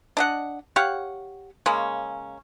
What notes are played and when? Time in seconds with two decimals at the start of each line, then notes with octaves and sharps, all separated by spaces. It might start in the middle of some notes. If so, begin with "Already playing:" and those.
0.17 D4 D#5 F#5
0.76 G4 C#5 F5 F#5
1.66 C#3 G#3 A#3 C#4